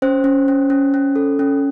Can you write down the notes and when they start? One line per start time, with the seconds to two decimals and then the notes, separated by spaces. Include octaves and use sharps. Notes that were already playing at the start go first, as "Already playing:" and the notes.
0.02 C#4 C5
0.24 C#4
0.48 C#4
0.70 C#4
0.94 C#4
1.16 A4
1.39 C#4